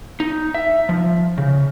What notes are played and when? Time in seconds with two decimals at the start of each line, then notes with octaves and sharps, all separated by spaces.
0.20 D#4
0.54 E5
0.89 F3
1.38 C#3